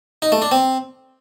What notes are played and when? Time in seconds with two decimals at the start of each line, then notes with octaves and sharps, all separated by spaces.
0.22 D#4
0.32 A3
0.42 D4
0.52 C4